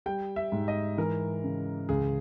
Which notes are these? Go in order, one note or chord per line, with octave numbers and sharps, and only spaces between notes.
G3 G5
E5
G#2
D#5
E3 A#4
C#3
C#2 G#4